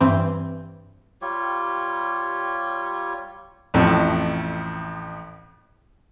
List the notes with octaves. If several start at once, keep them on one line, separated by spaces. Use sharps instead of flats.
G2 E3 C4
G3 F4 G4 C#5
A1 F2 A2